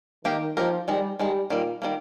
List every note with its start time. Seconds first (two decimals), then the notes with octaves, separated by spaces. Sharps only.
0.25 D#3 A#3 D#4 G4 A#4
0.57 F3 A#3 D#4 G4 A#4
0.88 D#3 G3 G#3 D#4
1.19 D#3 G3 G#3 D#4
1.50 A#2 D#3 G3 A#3
1.82 D#3 G3 A#3